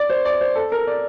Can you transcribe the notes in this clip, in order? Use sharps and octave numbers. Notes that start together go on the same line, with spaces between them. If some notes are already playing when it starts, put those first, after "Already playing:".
Already playing: D5
C5
D5
C5
A4
A#4
D5